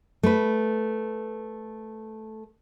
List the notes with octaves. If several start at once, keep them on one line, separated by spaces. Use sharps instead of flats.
A3 B4